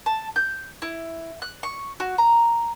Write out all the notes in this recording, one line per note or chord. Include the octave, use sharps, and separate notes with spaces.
A5
G6
E4
F#6
C#6
F#4
A#5